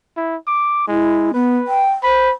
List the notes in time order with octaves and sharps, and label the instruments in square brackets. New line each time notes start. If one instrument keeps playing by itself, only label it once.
[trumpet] E4
D6
[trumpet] G#3 [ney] E4
[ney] B3 [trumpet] B4
[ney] G5
[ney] C5 [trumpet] B5